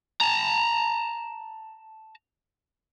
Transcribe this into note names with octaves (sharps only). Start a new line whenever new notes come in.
A5 A#5